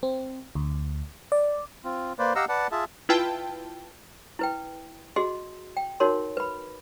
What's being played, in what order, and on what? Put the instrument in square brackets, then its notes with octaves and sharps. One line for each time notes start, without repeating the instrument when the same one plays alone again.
[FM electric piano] C4
D2
D5
[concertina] C4 F4
A#3 B4 C5 D5
G4 D#5 F5 F#5 A#5 E6
B4 D5 F#5 A5
F4 G#4 E5 A5
[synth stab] E4 F4 B4 G5 A5
[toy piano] E4 B4 G5
F#4 G#4 D#5 C6
G5
D#4 F#4 A#4 C#5 C6
B4 B5